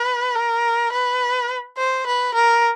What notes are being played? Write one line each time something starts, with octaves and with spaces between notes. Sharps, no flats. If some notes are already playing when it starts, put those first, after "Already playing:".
Already playing: B4
A#4
B4
C5
B4
A#4